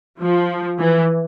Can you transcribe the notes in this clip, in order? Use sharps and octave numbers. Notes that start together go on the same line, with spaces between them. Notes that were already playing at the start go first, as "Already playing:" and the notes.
F3
E3